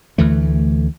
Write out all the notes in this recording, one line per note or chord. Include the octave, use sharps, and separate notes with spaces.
D2 E3 A3